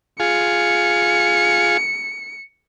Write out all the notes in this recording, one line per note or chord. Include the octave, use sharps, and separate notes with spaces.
F4 G#4 C#7